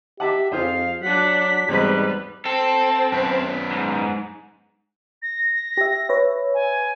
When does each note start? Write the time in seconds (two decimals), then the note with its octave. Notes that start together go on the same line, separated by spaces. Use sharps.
0.20 G4 E5 F#5 A5 D6
0.52 F2 F4 G#4 C5 F5
1.02 F#3 D4 F#5 B6
1.68 E2 G#2 G3 C4 B4 D#5
2.46 C4 A4
3.12 F#2 B3
3.71 G#2
5.22 A#6
5.77 G4 E5
6.09 B4 C#5 E5
6.54 G#5